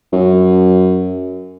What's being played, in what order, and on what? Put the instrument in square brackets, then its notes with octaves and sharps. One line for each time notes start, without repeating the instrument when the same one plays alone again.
[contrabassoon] F#2